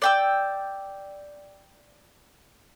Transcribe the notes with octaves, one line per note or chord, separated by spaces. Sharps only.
D5 G5 E6